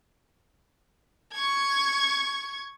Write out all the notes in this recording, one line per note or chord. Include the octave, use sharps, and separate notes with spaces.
C#6 G#6